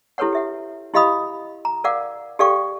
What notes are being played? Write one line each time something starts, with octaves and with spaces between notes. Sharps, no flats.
E4 G4 A4 B4 C#5 F#5
G4 E5 F#5
E4 G4 D#5 F5 B5 D#6
A#5
A#4 D5 F5 F#5 D6
G4 A4 D5 F5 G5 C#6